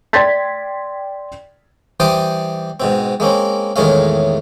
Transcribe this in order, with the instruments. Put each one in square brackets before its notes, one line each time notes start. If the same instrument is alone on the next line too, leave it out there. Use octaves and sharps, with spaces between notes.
[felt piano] D5 G5 C6 G#6 A6 B6
[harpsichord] E3 G3 C5 G5 A5 D#6
G#2 B2 C4
G#3 A#3 C4 C#4
E2 A2 D#3 G#3 C#4 F5